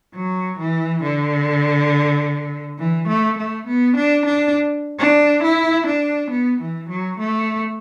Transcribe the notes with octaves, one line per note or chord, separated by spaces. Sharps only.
F#3
E3
D3
E3
A3
A3
B3
D4
D4
D4
E4
D4
B3
E3
F#3
A3